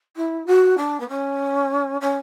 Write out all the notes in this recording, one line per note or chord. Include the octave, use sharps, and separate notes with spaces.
E4
F#4
D4
B3
C#4
C#4